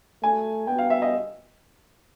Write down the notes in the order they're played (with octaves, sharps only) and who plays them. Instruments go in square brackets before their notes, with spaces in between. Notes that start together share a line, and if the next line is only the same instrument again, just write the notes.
[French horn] A3 [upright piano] G#5
[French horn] B3 [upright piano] G5
[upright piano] F5
E5
D#5